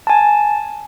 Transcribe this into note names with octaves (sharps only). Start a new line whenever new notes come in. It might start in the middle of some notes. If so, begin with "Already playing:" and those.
G#5 A5